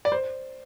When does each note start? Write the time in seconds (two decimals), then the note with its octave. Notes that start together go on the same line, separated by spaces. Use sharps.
0.05 D5
0.12 C5